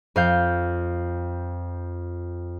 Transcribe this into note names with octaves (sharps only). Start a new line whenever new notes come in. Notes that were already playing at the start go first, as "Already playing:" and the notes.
F2 F5 G6